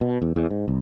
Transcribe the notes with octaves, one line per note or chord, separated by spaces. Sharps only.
B2
E2
E2
G#2
C2